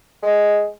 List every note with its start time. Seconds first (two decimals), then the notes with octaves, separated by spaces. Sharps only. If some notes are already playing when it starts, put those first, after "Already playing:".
0.23 G#3